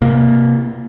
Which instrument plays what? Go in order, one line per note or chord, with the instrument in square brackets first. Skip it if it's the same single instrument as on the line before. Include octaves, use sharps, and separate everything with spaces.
[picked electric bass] C3 A#3